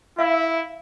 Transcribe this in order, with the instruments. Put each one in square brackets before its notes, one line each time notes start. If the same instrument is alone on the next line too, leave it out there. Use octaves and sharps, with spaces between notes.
[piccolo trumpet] E4 [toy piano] E5 F5 E6